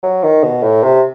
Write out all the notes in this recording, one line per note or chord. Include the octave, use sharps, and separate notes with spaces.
F#3
D#3
B2
A2
C3